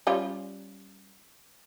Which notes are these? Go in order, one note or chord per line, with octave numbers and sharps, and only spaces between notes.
G3 C#4 F4